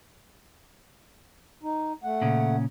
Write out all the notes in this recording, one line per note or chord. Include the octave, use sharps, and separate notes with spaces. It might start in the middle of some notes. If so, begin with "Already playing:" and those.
D#4
A3 F#5
A#2 C#3 C#4